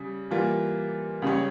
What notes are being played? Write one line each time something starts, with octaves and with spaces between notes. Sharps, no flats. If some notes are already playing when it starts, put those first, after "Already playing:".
Already playing: C#3 G3
E3 G3 A#3 F4
C#2 C#3 G3 C#4